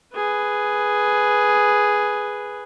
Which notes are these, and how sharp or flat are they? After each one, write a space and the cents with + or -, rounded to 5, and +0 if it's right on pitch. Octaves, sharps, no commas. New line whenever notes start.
G#4 +0 B4 +0